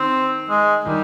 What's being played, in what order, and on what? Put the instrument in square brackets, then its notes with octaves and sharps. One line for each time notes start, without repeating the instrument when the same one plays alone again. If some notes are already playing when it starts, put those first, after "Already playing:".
Already playing: [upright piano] D#3 D#4 [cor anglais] C4
[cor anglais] G#3
[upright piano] D#3 D#4 [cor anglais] G3